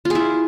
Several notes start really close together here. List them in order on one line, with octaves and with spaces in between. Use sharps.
F4 G#4 E4